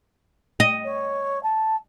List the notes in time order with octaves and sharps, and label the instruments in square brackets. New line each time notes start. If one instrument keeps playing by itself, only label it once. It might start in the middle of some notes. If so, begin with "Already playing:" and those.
[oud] D#5
[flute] C#5
A5